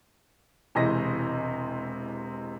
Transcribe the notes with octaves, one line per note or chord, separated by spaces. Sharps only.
E1 C3 E3 G#3 D#5 A#6